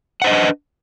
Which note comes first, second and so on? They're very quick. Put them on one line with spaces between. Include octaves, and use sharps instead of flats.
F#5 C5 D#5 D4 B4